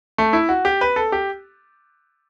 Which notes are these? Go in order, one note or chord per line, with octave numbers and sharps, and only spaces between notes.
A3
E4
F#4
G4
B4
A4
G4